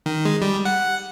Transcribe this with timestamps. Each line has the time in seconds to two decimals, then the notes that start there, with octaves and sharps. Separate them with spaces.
0.06 D#3
0.25 G#3
0.42 G3
0.65 F#5